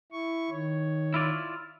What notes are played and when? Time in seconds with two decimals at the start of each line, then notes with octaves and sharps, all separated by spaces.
0.12 E4 C#6
0.50 D#3 C#5
1.14 E4 F4 D5